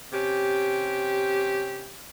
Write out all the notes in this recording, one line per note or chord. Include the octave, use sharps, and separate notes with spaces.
C3 C#4 G4